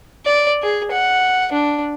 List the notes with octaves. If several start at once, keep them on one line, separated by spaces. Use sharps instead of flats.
D5
G#4
F#5
D4